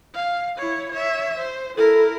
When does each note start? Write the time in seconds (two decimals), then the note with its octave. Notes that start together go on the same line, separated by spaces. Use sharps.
0.15 F5
0.58 E4 C#5
0.92 C#5 E5
1.38 C5
1.78 E4 A4 A#4